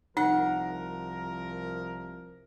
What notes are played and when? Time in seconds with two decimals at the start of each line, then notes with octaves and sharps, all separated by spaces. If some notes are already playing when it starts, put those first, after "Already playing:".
0.17 C2 F3 D#4 A#4 F#5